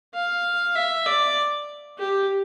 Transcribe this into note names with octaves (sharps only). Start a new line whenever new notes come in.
F5
E5
D5
G4